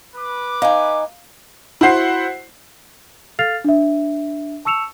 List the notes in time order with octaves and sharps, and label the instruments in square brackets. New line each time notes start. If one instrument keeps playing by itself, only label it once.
[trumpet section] B4 D6
[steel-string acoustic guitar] D#4 G#5 [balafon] F5
[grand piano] E4 F#4 C5 F#5 C7
[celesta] A4 F5 F6 A6 C7 F7
D4 E5
A5 C#6 E6 C#7 E7 F7